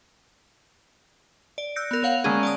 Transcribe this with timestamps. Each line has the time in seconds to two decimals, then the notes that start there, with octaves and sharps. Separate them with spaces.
1.58 D5
1.76 E6 F#6 G6 A#6 C#7 D7
1.91 B3 A#4
2.03 B3 C#5 F5 F#5 F7
2.24 D3 G#3 A#3 B3 C#4 G#4
2.43 D5 C#6 D#6